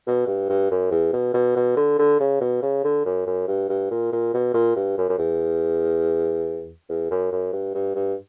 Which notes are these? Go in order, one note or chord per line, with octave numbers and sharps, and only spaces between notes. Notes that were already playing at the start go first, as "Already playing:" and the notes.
B2
G2
G2
F#2
E2
B2
B2
B2
D3
D3
C#3
B2
C#3
D3
F#2
F#2
G2
G2
A#2
A#2
B2
A#2
G2
F#2
F#2
E2
E2
F#2
F#2
G2
G2
G2